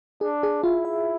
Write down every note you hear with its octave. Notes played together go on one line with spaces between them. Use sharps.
D4 G#4
G#4
E4 F4
E5